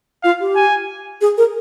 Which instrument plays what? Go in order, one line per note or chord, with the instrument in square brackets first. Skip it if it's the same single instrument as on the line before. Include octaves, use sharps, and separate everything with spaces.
[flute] F4 [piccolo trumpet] F5
[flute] G4
[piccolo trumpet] G#5
[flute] G#4
A#4